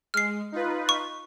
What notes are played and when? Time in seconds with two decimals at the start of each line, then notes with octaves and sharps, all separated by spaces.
0.14 G#3 F6 C7
0.52 D#4 F4 B4
0.89 C#6